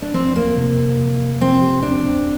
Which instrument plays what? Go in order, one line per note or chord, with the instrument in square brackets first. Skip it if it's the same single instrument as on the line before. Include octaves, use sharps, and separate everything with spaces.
[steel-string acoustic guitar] D4
[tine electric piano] F3 [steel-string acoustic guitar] C4
[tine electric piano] F3 [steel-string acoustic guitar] A#3
[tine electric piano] C3
C3
C3
F3
[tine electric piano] F3 [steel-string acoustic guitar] C4
[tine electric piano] G4
[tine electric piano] E2 [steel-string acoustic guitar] D4
[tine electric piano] C4